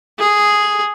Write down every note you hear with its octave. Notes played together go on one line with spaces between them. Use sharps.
G#4